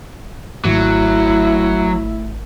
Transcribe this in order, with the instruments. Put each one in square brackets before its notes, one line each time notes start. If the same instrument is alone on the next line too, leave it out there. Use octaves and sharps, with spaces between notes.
[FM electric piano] G#1 [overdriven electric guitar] F#3 [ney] A3 [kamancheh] E4